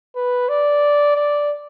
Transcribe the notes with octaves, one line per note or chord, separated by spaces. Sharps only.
B4
D5
D5